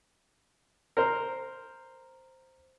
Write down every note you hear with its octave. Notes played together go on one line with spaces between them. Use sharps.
A#4 C5